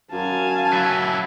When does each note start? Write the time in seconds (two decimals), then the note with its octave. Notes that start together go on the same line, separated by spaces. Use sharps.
0.12 F#2 F5 G#5 A5
0.73 F#3 E4